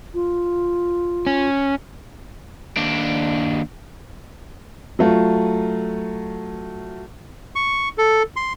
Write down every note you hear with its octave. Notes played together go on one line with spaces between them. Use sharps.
F4
C#4
D#2 D4
F#3 A3 F4
C#6
A4
C6